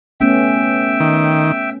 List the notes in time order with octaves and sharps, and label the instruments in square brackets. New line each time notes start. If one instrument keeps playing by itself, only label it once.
[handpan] A3 B3 C#4 [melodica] E5 G5
[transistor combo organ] D#3